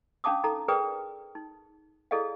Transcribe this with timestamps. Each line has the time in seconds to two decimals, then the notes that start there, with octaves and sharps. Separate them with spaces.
0.24 C#4 D4 F5 A5 D6 D#6
0.44 D#4 A4 A#5
0.68 G#4 A#4 B4 D5 G5 D#6
1.35 D#4
2.11 E4 G#4 A4 D5 D#5 F5